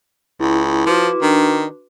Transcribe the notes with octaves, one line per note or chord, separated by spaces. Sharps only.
C#2 E4
F3 F#4 B4 D6
D#3 D4